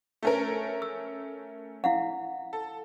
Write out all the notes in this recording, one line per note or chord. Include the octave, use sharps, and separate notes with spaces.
A3 C#4 A#4
E6
E4 F5 F#5
A4